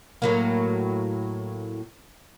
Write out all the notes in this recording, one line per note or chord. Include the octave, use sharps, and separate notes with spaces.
A2 F#3 A#3